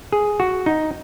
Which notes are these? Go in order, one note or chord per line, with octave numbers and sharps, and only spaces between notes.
G#4
F#4
D#4